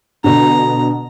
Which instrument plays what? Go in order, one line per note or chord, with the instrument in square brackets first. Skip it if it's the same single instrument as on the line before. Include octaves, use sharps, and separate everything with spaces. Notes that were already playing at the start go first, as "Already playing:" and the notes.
[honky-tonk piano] B2 D3 [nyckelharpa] A#5